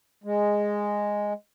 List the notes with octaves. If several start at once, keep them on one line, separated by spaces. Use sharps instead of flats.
G#3